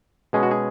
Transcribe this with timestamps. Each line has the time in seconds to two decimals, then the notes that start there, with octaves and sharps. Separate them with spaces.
0.33 B2 G#3 C#4 G#4
0.43 F#4
0.51 G#4